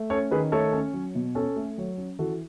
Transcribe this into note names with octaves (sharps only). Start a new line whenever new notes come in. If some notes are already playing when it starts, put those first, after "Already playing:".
Already playing: A3
C#4 A4 C#5
D#3 G#4 B4
A3 A4 C#5
C#4
F#3
B2
C#4 A4 C#5
A3
F#3
C#4
E3 F#4 A4